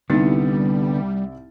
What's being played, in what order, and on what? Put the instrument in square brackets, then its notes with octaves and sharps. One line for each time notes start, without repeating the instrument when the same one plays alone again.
[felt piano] C2 E4 A6 [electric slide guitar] D3 B3 [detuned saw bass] G3 [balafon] D#4